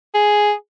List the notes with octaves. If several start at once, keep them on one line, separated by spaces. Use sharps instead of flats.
G#4